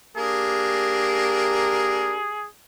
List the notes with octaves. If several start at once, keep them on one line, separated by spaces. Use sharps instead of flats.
A#3 D4 G4 G#4 A#4